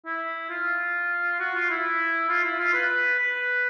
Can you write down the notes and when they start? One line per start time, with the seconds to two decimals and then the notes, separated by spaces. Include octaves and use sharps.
0.06 E4
0.50 F4
1.40 F#4
1.55 F4
1.70 E4
2.29 F4
2.44 E4
2.59 F4
2.73 B4
3.18 B4